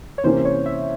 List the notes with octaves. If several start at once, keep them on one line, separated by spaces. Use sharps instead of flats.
C#5
C3 E3 A#3 C#4 C5
C#5
E5